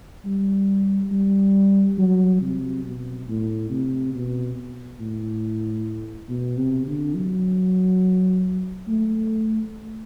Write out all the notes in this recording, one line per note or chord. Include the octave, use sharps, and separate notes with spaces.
G3
G3
F#3
C3
B2
A2
C3
B2
A2
B2
C3
D3
F#3
A3